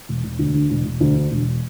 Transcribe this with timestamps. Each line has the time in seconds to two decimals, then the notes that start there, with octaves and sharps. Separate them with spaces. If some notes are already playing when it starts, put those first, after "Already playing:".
0.09 E1
0.24 E1
0.39 D2
0.55 D3
0.71 E1
0.86 E1
1.00 D2
1.16 D3
1.32 E1